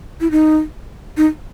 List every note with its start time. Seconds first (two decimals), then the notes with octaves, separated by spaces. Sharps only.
0.21 E4
0.31 D#4
1.17 D#4